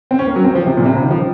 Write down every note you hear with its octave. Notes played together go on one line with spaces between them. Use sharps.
C4
C#4
A#3
F#3
C4
F3
C3
A#2
C3
C#3
D#3
F3